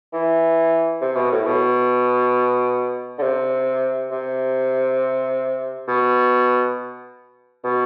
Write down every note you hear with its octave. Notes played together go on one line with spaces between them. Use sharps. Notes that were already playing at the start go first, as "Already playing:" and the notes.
E3
C3
B2
A2
B2
D3
C3
C3
B2
B2